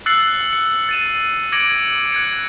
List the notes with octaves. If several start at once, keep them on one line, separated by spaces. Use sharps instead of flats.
E6 F#6 A6 C7 C#7 F#7
C#7
A6 D#7 E7
D6 G#6 A#6 C#7 D7 F#7
F#6 G#6 C#7